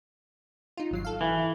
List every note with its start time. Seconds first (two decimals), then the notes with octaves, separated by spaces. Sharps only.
0.77 D#4 F4
0.91 G#1 F#3 C7
1.05 A4 F5
1.21 E3